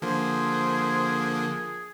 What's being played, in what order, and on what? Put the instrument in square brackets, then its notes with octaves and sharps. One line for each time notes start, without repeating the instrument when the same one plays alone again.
[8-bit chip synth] D3 F3 A#3 [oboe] G#4 [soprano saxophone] C5